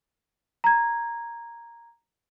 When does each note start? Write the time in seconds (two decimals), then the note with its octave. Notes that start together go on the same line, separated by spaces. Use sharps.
0.64 A#5 G#6